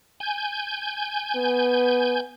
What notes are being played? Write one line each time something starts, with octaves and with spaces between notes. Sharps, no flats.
G#5 G6
B3